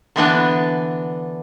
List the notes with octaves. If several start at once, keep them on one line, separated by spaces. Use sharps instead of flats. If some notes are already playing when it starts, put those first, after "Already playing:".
D3 E3 B3 D4